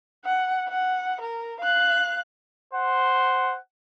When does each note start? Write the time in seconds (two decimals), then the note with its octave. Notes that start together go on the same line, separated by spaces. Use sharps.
0.25 F#5
0.69 F#5
1.21 A#4
1.61 F5 F#6
2.73 C5 F#5